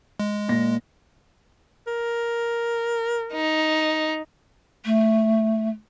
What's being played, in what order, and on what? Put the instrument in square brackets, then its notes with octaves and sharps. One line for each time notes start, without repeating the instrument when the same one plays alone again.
[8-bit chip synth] G#3
[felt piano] A#2 A#6
[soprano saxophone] A#4
[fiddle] D#4
[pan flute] A3